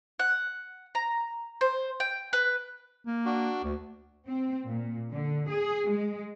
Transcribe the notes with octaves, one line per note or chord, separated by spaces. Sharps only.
F#5
A#5
C5
G5
B4
A#3
D4 F#4
D2
C4
A#2
D3
G#4
G#3